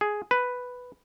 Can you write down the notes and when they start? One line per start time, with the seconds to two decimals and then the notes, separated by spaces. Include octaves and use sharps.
0.01 G#4
0.31 B4